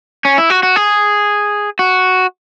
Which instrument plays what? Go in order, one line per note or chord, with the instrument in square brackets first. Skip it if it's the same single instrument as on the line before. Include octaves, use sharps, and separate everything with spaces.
[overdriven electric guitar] C#4
E4
F#4
F#4
G#4
F#4